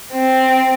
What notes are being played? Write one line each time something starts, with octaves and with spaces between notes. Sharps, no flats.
C4